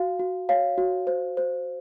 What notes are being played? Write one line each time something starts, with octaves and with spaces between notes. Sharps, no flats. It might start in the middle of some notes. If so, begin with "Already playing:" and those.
Already playing: F#4 F5
F#4
C#5 F5
F#4
C5
C5